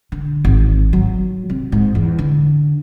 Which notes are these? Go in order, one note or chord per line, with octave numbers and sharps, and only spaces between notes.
D3
G#1
F#3
C3
G#2
E2
D3